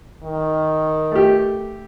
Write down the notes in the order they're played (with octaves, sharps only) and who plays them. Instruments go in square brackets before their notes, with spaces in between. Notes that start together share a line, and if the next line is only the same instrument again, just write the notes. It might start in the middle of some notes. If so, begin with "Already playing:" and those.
[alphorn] D#3
[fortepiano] A3 G4